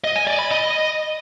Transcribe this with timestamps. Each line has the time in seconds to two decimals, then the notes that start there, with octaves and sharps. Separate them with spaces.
0.04 D#5
0.16 G#5
0.27 D5
0.39 B5
0.50 D#5